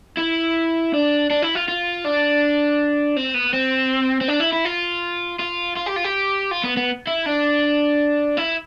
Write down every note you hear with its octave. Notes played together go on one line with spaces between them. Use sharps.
E4
D4
D4
E4
F4
F4
D4
C4
B3
C4
C4
D4
E4
E4
F4
F4
F4
G4
F4
G4
F4
B3
B3
E4
D4
E4